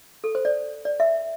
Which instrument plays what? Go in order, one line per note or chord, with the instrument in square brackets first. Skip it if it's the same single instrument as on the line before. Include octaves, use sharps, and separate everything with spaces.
[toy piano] A4
C5
D5
D5
E5